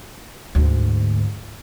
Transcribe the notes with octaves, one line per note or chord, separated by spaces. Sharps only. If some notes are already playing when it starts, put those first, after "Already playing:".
D2 G#2